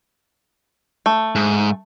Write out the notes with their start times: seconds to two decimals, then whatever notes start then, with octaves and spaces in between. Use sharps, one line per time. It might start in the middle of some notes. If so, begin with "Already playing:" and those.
1.06 A3
1.35 G#2